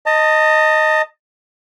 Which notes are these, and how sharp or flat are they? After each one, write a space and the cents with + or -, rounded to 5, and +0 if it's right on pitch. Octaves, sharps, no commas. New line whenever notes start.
D#5 +0 A5 +30